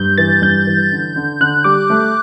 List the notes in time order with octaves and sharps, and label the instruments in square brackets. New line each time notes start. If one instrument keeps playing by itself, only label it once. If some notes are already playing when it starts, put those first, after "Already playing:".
Already playing: [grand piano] G2 [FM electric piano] G6
[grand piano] E3 [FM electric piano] A6
[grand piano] G2 [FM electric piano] G6
[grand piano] E3
D3
D3
[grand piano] D3 [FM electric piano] F#6
[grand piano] G3 [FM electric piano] D6
[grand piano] A3